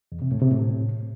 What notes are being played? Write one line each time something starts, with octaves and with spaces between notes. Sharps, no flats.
E2
C3
A2
C3
A2